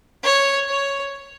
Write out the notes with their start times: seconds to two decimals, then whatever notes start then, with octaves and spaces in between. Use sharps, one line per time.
0.23 C#5
0.69 C#5